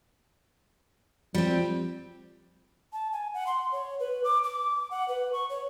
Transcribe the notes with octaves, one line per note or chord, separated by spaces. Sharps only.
F3 G3 C4
A5
G#5
F#5
C6
C#5
B4
D6
D6
F#5
B4
C#6
C#5